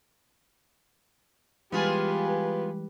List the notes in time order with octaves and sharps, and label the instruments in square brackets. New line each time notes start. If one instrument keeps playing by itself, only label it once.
[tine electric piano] E3 G3 G#3 [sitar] B3 F4 G#4 [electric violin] G4 B4